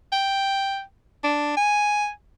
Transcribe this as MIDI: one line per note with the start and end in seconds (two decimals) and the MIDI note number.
0.12 0.81 79
1.24 1.55 62
1.57 2.10 80